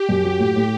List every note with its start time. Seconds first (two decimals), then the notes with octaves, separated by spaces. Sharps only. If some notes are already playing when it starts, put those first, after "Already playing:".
Already playing: G4
0.09 F#2
0.24 F#3
0.39 A2 G4
0.56 A2